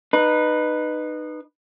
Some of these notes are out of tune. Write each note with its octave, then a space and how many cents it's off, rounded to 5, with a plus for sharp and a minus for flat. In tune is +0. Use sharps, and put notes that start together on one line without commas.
D#4 -25 B4 +0